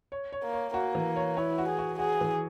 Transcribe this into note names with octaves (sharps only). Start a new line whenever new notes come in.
C#5
C#5
A#3
C#5
A#3 F#4
E3
C#5
E4 C#5
F#4
G#4
F#4
F#4 G#4
E3